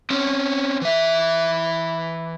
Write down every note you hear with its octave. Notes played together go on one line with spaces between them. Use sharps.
C4 C#4
E3 E5